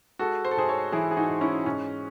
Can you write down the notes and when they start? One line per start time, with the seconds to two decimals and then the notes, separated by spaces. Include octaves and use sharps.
0.19 G#3 F#4 A4
0.45 C5
0.51 A4
0.57 G#2 G#4 C5
0.69 A4 C#5
0.92 E3 E4 G#4
1.11 G#4
1.17 D#4 F#4
1.29 G#2
1.41 C#4 E4
1.66 G#2 C#4